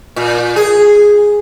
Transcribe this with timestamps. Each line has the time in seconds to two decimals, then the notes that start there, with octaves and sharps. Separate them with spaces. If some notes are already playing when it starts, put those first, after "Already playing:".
0.16 A#2
0.56 G#4